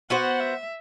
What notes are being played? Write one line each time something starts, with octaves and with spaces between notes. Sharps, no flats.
B3 F#4 C5 F#5
E5